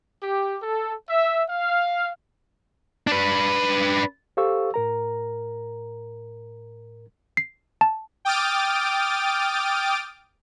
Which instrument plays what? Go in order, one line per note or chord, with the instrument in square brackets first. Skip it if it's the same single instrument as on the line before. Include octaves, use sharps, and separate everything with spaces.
[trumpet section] G4
A4
E5
F5
[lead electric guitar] D4 B4
[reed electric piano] G4 A4 C5 F5 C#6 E6
A2 A#4 A#5
[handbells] C7
A5
[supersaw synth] G5 D6 D#6 F6 A6 D7